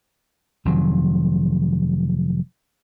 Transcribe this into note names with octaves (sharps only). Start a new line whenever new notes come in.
F1 F2 D#3 F#3